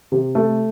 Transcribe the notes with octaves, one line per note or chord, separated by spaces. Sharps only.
C3
A3